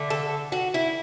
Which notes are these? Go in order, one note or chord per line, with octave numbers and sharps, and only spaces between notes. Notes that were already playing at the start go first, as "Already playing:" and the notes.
Already playing: D3 A3
A4
F#4
E4